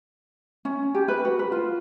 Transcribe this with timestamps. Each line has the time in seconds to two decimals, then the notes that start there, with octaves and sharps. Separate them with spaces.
0.65 C#4
0.95 G4
1.08 B4
1.25 F#4
1.39 B4
1.52 F4